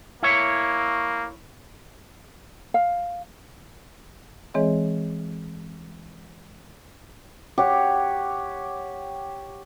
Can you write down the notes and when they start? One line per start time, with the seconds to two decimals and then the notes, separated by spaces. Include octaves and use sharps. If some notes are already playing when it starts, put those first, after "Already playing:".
0.23 A#3 E4 C#5
2.74 F5
4.54 E3 G#3 C4 G#4 C#5 D#5
7.58 G4 C#5 F#5